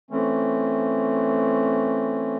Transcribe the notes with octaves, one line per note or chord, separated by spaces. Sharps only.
E3 A3 C4 C#4